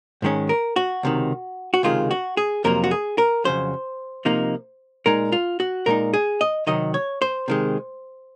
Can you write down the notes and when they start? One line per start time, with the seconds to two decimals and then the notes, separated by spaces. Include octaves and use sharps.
0.22 G#2 D#3 G#3 C#4
0.49 A#4
0.76 F#4
1.03 C#2 C3 D#3
1.74 F#4
1.83 C#2 C3 D#3 G#3 F4
2.11 F#4
2.37 G#4
2.64 F2 C3 F#3 A#3 A#4
2.84 F#4
2.91 G#4
3.18 A#4
3.44 F2 C#3 F#3 C5
4.25 C3 F3 A#3 D#4
5.06 A#2 G#3 D#4 A#4
5.32 F4
5.60 F#4
5.86 A#2 G#3 D#4 A#4
6.14 G#4
6.41 D#5
6.67 C3 D#3 F#3 D#5
6.94 C#5
7.22 C5
7.48 C3 D#3 G#3